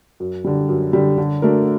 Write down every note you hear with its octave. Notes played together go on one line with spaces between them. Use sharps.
F#2
D3 G3
F#2
D3 G3
D3
A3 D4 F#4 A#4